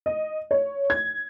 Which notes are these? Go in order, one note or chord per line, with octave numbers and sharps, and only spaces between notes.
D#5
C#5
G#6